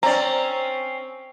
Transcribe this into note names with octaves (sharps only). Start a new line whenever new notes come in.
C4 C#4 D5 A#5